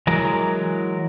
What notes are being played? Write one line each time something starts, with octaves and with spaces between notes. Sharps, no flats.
E3 F#3 G#3 A#4